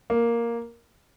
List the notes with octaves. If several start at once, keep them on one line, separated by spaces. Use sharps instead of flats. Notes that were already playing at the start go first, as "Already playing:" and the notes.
A#3